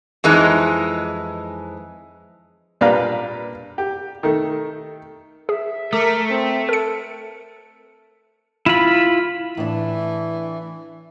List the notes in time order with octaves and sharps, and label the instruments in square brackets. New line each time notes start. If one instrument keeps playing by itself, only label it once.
[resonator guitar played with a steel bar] F2 E3 G#3 D#4
[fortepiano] A#2 G3 D4 B4 F5 A#5
G4
D#3 A3
[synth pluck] G#4 [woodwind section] E5
[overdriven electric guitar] A3 [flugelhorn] A#4 [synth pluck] D6
[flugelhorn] C4
[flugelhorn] A4 [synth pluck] A#4 C#7
[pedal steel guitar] E4 F4 B5
[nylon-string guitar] A2 D4 [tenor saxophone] E3